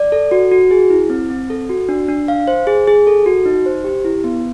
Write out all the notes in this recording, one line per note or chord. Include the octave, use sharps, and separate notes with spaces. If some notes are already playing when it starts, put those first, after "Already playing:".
Already playing: D5
A4
F#4
F#4
G#4
E4
C4
C4
A4
F#4
D4
D4
F5
C5
G#4
G#4
A4
F#4
D#4
C5
G4
E4
B3